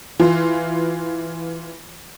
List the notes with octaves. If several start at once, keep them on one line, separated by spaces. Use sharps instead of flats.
E3 F4